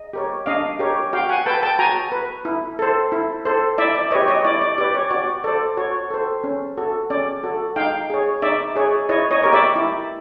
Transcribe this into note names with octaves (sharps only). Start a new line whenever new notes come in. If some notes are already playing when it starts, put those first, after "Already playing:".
Already playing: D#5
G4 A#4 C#5
D4 D#5 F5
G4 A#4 C#5
F#4 F5 G5
F#5 G#5
B4 G5 A5
G5 A5
F#4 G#5 A#5
B4
E4
A4 C5
E4
A4 C5
E4 D5 E5
D5
G4 B4 C#5 D#5
C#5 D#5
E4 D5
D5
G4 B4 D5
C#5
F#4 D5
A4 C5 D5
F#4 C#5
A4 C5
C#4
F#4 A4
C#4 D5
F#4 A4
D#4 F5 G5
G#4 C#5
D#4 D5 E5
G#4 C#5
E4 C#5 D#5
C#5 D#5
G4 A#4 C#5
D5 E5
E4